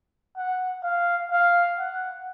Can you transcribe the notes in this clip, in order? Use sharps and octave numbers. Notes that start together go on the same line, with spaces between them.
F#5
F5
F5
F#5